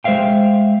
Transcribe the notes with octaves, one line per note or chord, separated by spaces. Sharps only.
G#3 C5 D5 E5 F5 G5